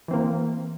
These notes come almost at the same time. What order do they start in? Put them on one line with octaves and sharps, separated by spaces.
E3 C4 A#3